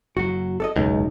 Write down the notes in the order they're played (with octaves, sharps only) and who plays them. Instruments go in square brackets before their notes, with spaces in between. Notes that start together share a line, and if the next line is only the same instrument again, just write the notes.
[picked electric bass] F#1 F#3 [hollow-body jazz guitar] F#4
[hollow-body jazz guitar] A4 D5 D#5
[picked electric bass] E1 F#2 [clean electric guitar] C#2 [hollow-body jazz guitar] D#4